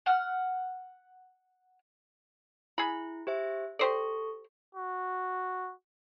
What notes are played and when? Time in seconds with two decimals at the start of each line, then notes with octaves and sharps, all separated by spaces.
0.06 F#5 F6
2.78 E4 G#4 B5
3.27 G4 C5 E5
3.79 G4 A4 C5 D5 C#6
4.75 F#4